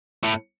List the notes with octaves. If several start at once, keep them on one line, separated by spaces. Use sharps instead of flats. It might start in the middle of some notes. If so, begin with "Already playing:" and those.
A2